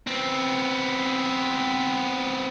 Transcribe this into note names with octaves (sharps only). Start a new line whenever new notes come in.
B3 C4